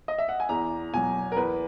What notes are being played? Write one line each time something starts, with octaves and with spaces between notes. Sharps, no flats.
D#5
E5
F#5
G#5
E2 A#5
B2 F#3 G#5
A#4
E2 B4